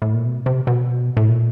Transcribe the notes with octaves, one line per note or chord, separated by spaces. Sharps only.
A2
A#2
B2
C3
B2
A2
A#2